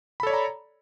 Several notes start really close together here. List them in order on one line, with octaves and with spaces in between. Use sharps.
B5 A4 C#5 D5 A#5